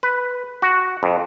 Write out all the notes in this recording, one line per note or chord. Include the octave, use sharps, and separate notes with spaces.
B4
F#4
F2